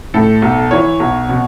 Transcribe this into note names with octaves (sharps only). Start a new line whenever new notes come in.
A2 A4
B1
E3 C#5
B1
B2